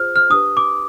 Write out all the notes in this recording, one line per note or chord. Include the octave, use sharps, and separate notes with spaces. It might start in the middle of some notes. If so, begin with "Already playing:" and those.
Already playing: F4 G#4 C5 F6
F6
D4 G4 B4 D#6
D6